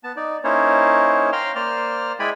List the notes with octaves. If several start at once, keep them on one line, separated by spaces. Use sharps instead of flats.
B3 A5
D#4 D5
A#3 C#4 D#4 E4 C5 C#5
F5 G5 A#5 C6 F6
A#3 C5 D5 F6
G#3 E4 D5 G5 G#5 B5